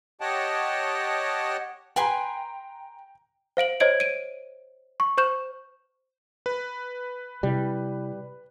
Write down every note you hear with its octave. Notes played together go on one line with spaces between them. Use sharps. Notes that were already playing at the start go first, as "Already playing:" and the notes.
G4 C#5 D#5 F#5 G5 A5
B4 G5 G#5 A#5 C6
C5 F5 D7 F#7
C5 C#5 D#5 G#6 D7 F#7
D7 D#7
C#6
C5 C#6 G6 E7
B4
C3 G3 E4